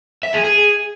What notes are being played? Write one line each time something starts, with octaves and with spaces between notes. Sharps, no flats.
E5
G#4
G#4